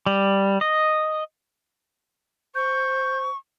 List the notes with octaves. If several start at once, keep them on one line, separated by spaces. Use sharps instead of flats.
G3
D#5
C5 C#6 G6